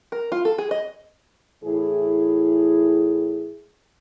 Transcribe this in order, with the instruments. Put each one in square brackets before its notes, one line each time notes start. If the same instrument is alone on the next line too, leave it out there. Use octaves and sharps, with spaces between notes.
[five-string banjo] A#4
F4
A4
G#4
D#5
[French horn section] A2 E3 E4 G#4